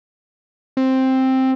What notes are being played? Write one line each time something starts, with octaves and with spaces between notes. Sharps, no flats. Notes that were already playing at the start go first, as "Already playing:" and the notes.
C4